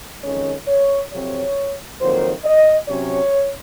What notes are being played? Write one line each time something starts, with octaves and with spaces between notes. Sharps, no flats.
F2 D#3 G#3 C#4 C#5
C#5
F2 C3 F#3 C4 C#5
F2 D#3 F#3 A#3 C5
D#5
C3 F#3 C#4 C#5